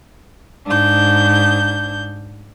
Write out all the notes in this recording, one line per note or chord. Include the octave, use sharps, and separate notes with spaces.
G#2 D4 G6